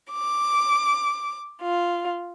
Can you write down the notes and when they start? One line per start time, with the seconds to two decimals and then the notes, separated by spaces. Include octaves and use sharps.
0.13 D6
1.63 F4